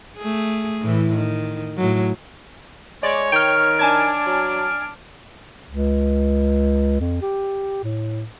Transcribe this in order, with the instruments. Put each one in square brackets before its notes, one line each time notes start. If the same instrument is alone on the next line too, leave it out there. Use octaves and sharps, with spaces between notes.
[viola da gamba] A3 G#4
A2 E3
D#3
A2 F#3
[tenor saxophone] G#3 [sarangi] C#5 [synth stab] D5
[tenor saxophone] D#3 [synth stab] G5 [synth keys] F6 D7
[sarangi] D4 [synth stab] G#5 A5 G#6
[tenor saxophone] F#3
[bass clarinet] C#2
F2
G4
A2